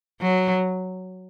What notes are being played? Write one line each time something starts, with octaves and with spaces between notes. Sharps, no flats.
F#3